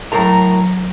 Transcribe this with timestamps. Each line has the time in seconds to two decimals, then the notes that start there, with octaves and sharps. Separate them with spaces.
0.12 A2 F#3 A#4 A#5